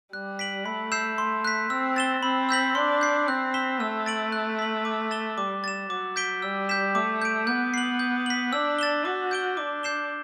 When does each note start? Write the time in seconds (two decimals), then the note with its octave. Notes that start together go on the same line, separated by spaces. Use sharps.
0.13 G3 F#6
0.39 B6 D7 F#7
0.65 A3 B5
0.92 E6 G6 C7 E7
1.18 C6
1.45 F#6 B6
1.70 C4 E6
1.96 A6 E7 G7
2.23 C4 B5
2.49 E6 G6 B6 F#7
2.75 D4 C6
3.01 G6 C7
3.28 C4 F#6
3.54 B6 E7 G7
3.80 A3 E6
4.06 A6 D7 F#7
4.32 F#6
4.59 B6 F#7
4.85 D6
5.11 A6 E7 G7
5.37 G3 D6
5.64 A6 E7
5.90 F#3 D6
6.16 G6 B6 D7 G7
6.42 G3 E6
6.69 G6 B6 E7
6.95 A3 D6
7.22 G6 D7
7.47 B3 G6
7.74 C7 F#7
7.99 G6
8.26 B6 F#7
8.53 D4 E6
8.79 A6 E7 G7
9.05 F#4 D6
9.31 G6 D7 G7
9.57 D4 D6
9.83 G6 C7 E7 G7